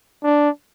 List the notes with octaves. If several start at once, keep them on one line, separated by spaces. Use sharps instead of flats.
D4